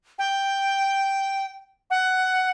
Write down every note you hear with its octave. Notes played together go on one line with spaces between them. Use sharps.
G5
F#5